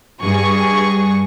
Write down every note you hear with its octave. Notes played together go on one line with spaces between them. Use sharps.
G2 G#4 C#6